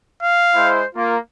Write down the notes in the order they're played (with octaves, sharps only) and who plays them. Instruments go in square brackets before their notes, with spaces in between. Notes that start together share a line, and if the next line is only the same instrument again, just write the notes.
[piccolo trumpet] F5
[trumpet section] G#3 E4 C5
[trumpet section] A#3 [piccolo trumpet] F4